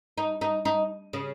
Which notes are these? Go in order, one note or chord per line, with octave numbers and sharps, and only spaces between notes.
D#4
D#4
D#4
C#3